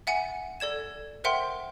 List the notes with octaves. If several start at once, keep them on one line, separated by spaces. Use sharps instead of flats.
E5 F#5 G#5 C#7
A4 D5 G#6 E7
A#4 C5 E5 F#5 G5 C6